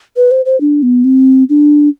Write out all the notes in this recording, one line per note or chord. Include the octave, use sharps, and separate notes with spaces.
B4
C5
C5
D4
B3
C4
D4